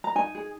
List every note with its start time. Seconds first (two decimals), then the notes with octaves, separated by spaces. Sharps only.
0.04 A#5
0.15 D#4 G#5
0.35 G#4